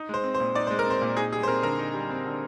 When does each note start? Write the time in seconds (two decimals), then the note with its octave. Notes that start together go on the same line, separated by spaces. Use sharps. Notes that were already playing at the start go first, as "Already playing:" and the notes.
Already playing: D#4
0.09 G#3 C5
0.24 C4
0.34 C5
0.40 A#2
0.55 D#4 D5
0.67 G#3 C5
0.79 A#4
0.86 C4 C5
1.02 A#2
1.16 D#4 G#4
1.33 G3 G#4
1.43 C5
1.48 C4 A#4
1.63 D3 A#4
1.79 D#4
1.94 G3
2.10 C4
2.26 D3